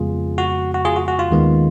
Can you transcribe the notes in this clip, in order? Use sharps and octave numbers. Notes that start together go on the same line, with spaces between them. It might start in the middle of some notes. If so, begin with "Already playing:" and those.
Already playing: F2 C#3 G#3 B3 F4 G#4
F#4
F#4
F4 G#4
F#4
F#4
F4
D#2 D#3 G#3 B3